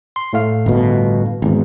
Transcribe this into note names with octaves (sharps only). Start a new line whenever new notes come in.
C6
A2 A3 F5
G1 B2
G#1 E2